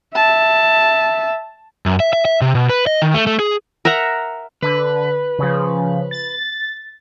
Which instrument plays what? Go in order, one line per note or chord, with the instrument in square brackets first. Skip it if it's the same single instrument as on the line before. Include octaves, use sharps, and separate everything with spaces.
[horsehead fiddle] E5 [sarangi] A5
[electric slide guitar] F#2
E5
E5
E5
C3
B2
B4
D#5
D#3
A3
A3
G#4
[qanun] A#4 E5 F#5 A#5
[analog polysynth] D3 [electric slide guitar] B4
[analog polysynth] C#3 F3
A6